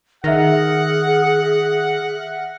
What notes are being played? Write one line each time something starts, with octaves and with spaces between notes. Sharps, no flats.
D#3 G#4 E5 F#5 F6 A#6